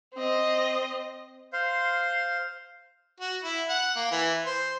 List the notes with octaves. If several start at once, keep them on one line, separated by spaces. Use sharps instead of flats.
C4 D#5
C5 F5 C6
F#4
E4
F#5
A#3
E3
C5